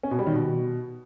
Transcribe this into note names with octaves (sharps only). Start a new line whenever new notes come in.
C#4
B2
G3
D#3
B2